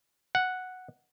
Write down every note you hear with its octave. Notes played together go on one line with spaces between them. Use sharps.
F#5